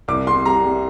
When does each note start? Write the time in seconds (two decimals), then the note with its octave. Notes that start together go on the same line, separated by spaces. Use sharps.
0.08 C2 D6
0.27 C3 C6
0.46 G3 A#5
0.65 G3